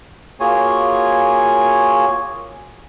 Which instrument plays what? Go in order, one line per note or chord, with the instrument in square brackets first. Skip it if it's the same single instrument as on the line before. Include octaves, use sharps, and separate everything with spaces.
[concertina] A#3 F4 F#4 G#4 C#5 G#5